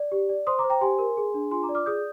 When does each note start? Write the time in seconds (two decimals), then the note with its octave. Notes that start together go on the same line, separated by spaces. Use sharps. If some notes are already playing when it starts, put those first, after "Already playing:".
Already playing: D5
0.12 G4
0.29 D5
0.47 C5 C6 D#6
0.59 A#5 D6
0.64 C5
0.70 G5 A#5
0.81 G4 G#5 C6
0.99 A#4
1.17 G#4
1.34 D4
1.51 F4 G#5 C6
1.63 A#5 D6
1.69 D5
1.75 D6 F6
1.86 G#4 D#6 G6